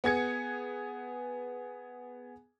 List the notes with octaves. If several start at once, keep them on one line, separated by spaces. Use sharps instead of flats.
B3 G#4 G#6 C#7